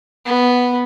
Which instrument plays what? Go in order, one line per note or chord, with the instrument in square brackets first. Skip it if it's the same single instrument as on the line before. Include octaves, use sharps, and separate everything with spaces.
[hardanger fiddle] B3